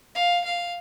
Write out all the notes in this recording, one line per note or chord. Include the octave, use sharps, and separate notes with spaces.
F5
F5